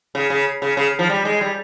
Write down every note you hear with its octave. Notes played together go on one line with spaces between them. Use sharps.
C#3
C#3
C#3
C#3
F3
G3
G#3
G3